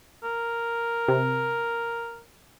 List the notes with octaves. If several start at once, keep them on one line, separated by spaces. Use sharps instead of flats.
A#4
C3